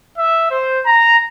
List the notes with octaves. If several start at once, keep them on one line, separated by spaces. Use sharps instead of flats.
E5
C5
A#5